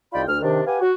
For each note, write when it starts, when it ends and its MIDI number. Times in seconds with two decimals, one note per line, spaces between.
0.13 0.22 36
0.13 0.22 63
0.13 0.22 65
0.13 0.22 74
0.13 0.22 79
0.13 0.22 83
0.27 0.40 38
0.27 0.40 89
0.43 0.61 48
0.43 0.61 51
0.43 0.61 62
0.67 0.80 67
0.67 0.80 71
0.67 0.80 77
0.67 0.80 78
0.67 0.80 80
0.81 0.93 66